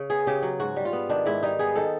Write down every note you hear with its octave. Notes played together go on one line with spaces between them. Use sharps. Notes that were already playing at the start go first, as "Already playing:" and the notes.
Already playing: C#3
B3 G#4
C#3 G4
F#3
G#2 F#4
G3
F4
B3
D#3 D4
G#2 E4
G3 D#4
B3 G#4
D#3 A4